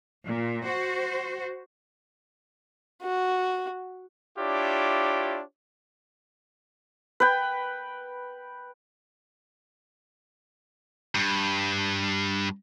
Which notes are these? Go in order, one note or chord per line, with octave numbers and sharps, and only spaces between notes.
A#2
F#4 C5
F#4
D4 E4 F4 G4 C#5
B4 G5
G2